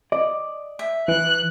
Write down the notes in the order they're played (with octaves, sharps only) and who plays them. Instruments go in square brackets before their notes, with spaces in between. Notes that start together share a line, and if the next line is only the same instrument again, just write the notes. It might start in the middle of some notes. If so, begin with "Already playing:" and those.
[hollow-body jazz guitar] D5 D#5
[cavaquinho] E5
[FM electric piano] E3 [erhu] F#6